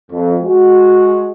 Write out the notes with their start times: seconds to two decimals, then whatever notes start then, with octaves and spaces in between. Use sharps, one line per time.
0.11 F2
0.42 G#3 F#4